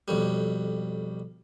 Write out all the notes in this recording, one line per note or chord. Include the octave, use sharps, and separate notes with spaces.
B1 F2 G3